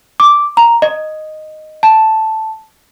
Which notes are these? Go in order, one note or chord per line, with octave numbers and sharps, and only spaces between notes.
D6
A#5
D#5
A5